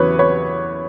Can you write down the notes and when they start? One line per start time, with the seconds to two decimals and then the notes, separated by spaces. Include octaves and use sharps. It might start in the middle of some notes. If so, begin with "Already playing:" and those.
Already playing: E2 C#3 F#3 B4 C#5
0.19 B4 C#5